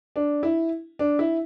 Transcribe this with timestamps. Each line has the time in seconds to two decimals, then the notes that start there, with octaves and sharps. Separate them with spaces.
0.16 D4
0.43 E4
0.99 D4
1.19 E4